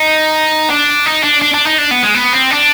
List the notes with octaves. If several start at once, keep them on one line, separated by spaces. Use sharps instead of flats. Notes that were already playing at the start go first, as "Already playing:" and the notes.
Already playing: D#4
D4
D#4
D4
D4
D4
D#4
D4
B3
G#3
B3
C4
D4